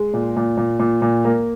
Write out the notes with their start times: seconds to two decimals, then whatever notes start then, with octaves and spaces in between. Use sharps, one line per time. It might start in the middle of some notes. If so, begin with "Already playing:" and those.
Already playing: G#3
0.14 A#2
0.36 A#2
0.57 A#2
0.80 A#2
1.02 A#2
1.25 A#3